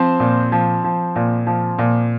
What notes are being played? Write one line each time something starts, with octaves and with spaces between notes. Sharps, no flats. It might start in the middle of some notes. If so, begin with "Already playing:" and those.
Already playing: F3 C4 C5
A#2
F3
F3
A#2
F3
A#2